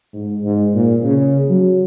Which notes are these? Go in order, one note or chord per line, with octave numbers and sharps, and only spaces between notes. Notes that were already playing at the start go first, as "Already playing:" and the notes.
G#2
G#2
A#2
C#3
F#3